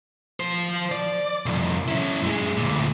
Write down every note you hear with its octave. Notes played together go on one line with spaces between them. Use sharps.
F3 C5
D5
C2 F2
C#4 E4
F#2 G#3
D2 A#2